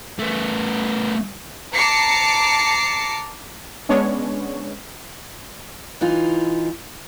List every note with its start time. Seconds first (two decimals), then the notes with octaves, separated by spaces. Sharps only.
0.19 A3 B3
1.75 A5 A#5 D6 C7 C#7
3.89 G#3 B3 C#4 D4 C#5
6.01 E3 D#4 F4